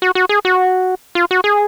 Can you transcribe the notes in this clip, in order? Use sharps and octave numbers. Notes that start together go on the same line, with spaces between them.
F#4
F#4
G#4
F#4
F4
F#4
G#4